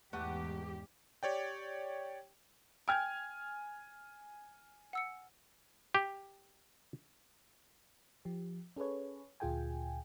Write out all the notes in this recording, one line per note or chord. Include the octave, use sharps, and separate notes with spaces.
E2 G#2 A3 G4 B4 F#5
G4 C#5 D5 G5
G5 G#5 F6 G6 G#6
F#5 E6 C#7
G4
F3 G4
C#4 G#4 A4 B4 C#5
D2 A#2 F4 G#4 G5 G#5